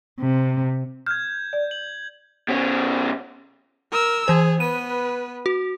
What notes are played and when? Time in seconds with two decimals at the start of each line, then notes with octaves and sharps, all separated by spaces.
0.20 C3
1.06 F6 G6 G#6
1.53 D5
1.71 F#7
2.48 B2 C#4
3.92 A#4 E6
4.28 E3 G#4 C5
4.60 B3 B4 D#7
5.46 F#4